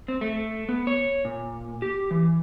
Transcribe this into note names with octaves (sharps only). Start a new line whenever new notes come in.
C4
A3
B3
C#5
A#2
G4
E3